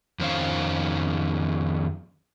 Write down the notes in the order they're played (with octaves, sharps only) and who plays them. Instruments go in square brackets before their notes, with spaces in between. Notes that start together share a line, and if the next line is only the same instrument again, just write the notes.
[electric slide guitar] F2 D#3 C#4 C5 F5